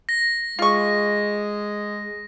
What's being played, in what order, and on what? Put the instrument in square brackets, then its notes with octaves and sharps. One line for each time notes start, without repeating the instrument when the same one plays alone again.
[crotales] A#6
[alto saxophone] G#3 [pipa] F4 C#6